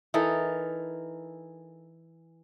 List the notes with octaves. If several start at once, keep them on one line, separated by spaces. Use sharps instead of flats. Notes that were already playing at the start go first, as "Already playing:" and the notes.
E3 D#4 A4 A#4